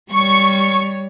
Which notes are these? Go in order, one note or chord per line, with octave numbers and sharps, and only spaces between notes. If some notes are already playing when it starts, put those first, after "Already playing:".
G3 C#5 C#6